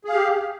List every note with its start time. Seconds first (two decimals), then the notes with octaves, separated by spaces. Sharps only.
0.05 G#4
0.09 F5
0.13 G4